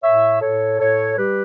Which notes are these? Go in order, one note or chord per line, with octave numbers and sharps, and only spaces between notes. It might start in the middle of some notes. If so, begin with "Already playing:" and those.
A2 C#5 E5
A2 A4 C#5
A2 A4 C#5
G3 G4 B4